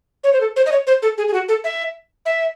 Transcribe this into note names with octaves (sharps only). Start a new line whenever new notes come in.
C#5
C5
A4
C5
D#5
C#5
C5
A4
G#4
G#4
F#4
A4
E5
E5